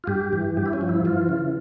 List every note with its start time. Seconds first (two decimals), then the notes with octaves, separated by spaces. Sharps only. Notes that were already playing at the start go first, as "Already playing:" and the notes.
0.04 F4
0.07 G2 G4
0.33 E3
0.57 G2 G4
0.66 E4
0.73 C#4
0.81 F3
0.89 E4
1.05 E3 F4
1.29 C#3